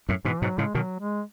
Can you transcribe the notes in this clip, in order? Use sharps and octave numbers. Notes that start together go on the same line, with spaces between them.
F#2 A2
G#2 B2 E3
G#2 B2 F#3
A2 C#3 G#3
B2 D#3 F#3
G#3